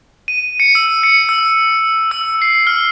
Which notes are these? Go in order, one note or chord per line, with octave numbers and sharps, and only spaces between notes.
D#7
C#7
E6
C#7
E6
E6
C7
F6